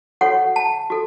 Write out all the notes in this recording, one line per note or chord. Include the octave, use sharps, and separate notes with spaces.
F#4 A4 C#5 F#5
A5
F#4 A4